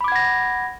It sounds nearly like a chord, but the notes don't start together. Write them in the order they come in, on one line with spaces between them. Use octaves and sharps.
B5 D6 G#6 F#5 A#6